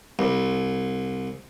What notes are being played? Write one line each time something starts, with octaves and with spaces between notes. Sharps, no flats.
C2